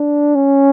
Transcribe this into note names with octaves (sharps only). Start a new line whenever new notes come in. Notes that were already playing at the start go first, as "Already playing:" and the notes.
Already playing: D4
C#4